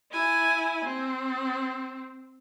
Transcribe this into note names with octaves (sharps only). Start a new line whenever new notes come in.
E4 G#5
C4